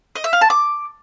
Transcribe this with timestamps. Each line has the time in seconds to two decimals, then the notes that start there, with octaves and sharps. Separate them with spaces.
0.15 D#5
0.24 E5
0.33 F5
0.41 A5
0.50 D6